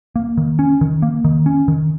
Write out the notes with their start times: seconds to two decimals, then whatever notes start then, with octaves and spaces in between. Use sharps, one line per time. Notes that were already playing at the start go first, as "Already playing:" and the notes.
0.16 A#3
0.38 D#3
0.59 C#4
0.81 D#3
1.02 A#3
1.25 D#3
1.46 C#4
1.68 D#3